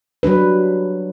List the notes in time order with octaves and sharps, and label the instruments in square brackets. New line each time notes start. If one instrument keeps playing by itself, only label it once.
[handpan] F#3 G3 D4 B4